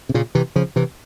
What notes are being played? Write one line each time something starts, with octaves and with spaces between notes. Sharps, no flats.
C3
A#2 C#3
C3 E3
C#3 F3
C3 E3